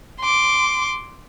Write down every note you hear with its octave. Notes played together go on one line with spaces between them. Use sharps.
C6 D6